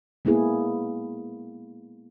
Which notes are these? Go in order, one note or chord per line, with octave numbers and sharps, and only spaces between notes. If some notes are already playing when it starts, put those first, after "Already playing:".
G#3 A#3 B3 E4 G#4